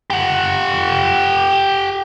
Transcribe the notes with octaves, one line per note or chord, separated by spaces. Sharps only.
G4 F#5